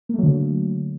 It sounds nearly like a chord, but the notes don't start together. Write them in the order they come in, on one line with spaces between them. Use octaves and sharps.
A#3 A3 F#3 D3